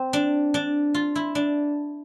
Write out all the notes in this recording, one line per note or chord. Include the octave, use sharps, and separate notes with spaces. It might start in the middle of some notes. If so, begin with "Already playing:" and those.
Already playing: C4
D4
D4
F4
E4
D4